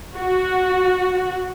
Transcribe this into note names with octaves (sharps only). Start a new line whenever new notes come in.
F#4